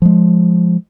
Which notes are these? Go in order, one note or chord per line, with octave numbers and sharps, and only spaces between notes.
F3 G#3